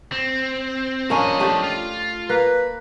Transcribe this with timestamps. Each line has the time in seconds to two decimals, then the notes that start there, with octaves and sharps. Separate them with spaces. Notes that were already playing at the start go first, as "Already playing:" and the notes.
0.12 C4
1.10 F3 A#3 C#4 D4 D#5
1.40 A3 D4 G4
1.63 F4
2.29 A#3 B4